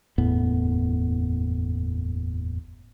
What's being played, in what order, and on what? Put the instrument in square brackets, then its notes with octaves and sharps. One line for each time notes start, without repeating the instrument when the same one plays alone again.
[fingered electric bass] F#1 E2 A2 B3